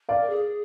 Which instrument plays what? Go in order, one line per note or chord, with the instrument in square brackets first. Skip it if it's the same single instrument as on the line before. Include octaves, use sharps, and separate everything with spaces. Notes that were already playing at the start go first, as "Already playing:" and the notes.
[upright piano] D5 F5
[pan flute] A#4
G#4